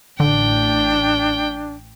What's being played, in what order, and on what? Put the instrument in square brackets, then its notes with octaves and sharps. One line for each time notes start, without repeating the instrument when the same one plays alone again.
[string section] A1 [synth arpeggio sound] D3 [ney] D4 [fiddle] G5